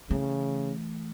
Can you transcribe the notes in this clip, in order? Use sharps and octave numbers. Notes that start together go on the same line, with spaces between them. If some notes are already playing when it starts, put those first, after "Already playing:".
C#3 E3 A3